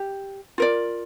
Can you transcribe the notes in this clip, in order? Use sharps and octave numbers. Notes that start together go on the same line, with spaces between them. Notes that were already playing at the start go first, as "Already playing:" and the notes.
Already playing: G4
F4 A#4 D5